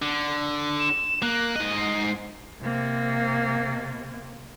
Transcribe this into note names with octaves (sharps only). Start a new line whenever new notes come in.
D3
E7
A#3 F#6
G#2 D#5
C7
C3 A#3